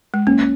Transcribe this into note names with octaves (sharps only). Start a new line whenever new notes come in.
G#3
A#3 C#4